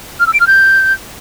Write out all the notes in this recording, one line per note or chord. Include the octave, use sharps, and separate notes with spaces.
F6
E6
D7
F6
G6